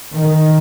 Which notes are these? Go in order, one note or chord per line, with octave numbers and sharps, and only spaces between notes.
D#3